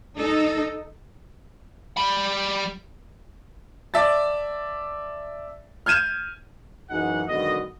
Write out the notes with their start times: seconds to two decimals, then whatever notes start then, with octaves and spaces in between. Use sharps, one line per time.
0.17 D#4 A4 D#5
1.97 G3 B5
3.94 D5 E5 A5 A6
5.86 F6 G6 G#6 D#7 E7
6.90 F#2 E3 F#3 D#4 G#4 F#5
7.28 B1 G#2 B2 D3 D#3 D#5